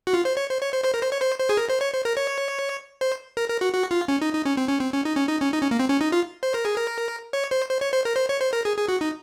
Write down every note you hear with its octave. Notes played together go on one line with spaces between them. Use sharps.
F#4
F4
C5
C#5
C5
C#5
C5
C5
A#4
C5
C#5
C5
C5
G#4
A#4
C5
C#5
C5
A#4
C#5
C5
A#4
A#4
F#4
F#4
F4
C#4
D#4
D#4
C#4
C4
C#4
C4
C#4
D#4
C#4
D#4
C#4
D#4
C#4
A#3
C4
C#4
D#4
F4
C5
A#4
G#4
A#4
C#5
C5
C5
C#5
C5
A#4
C5
C#5
C5
A#4
G#4
G#4
F#4
D#4